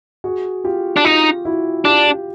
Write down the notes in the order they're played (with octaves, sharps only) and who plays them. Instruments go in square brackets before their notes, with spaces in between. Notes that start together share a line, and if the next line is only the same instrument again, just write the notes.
[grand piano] F#4 G#4
F4 G4
[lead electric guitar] D4
[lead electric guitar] D#4 [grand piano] F4
[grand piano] E4 F#4
[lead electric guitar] D4 [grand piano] F4 G4
[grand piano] F4 G4